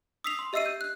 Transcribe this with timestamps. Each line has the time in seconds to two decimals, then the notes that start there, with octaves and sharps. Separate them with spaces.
0.24 D#6 E6 B6 C7 F7
0.39 C6
0.53 G4 D#5 E5 E6 C7 D#7
0.66 G6
0.81 F#6